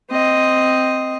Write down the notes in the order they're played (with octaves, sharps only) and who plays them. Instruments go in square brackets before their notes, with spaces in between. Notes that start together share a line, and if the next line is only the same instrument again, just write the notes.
[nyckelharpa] C4 D#5